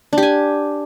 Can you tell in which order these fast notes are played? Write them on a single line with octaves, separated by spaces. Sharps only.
D4 G4 G#5